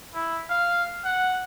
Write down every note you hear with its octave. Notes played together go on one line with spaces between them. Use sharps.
E4
F5
F#5